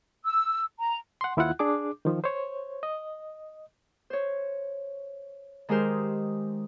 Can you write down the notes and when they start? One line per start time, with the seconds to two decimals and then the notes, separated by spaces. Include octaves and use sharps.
0.24 E6
0.79 A#5
1.21 F#5 C6
1.37 D#2 E4 F4 F#5 F#6
1.59 D4 G#4 D6
2.05 D#3 F3
2.24 C5 C#5
2.83 D#5
4.10 C5 C#5
5.69 D#3 G#3 G4 G#4 A#4 C5